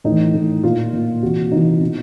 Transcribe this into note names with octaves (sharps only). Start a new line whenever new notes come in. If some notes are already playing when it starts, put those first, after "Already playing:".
A2 E3 D#4
A2 E3
A#2 F4
A#2
C3 E3 F#4
C3 E3 D#4
B2